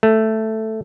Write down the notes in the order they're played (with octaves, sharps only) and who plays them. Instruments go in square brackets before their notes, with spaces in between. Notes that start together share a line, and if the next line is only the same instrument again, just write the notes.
[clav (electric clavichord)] A3